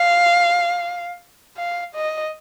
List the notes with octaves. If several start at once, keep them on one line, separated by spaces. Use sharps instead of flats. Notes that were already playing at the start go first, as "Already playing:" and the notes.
Already playing: F5
F5
D#5